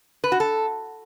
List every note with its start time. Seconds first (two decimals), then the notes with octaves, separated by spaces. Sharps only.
0.24 B4
0.32 F#4
0.40 A4